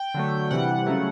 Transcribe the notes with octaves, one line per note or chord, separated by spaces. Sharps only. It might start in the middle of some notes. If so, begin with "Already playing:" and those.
Already playing: G5
D3 F#3 A3
C3 E3 G3 F#5
C#3 F#3 A3